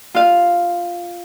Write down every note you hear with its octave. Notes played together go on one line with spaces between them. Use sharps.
F4 F5